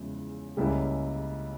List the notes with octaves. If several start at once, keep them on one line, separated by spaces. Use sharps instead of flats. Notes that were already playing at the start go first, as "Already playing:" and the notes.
Already playing: E2 C#3 F3 G#3 E4
C#2 C#3 G3 A#3 E4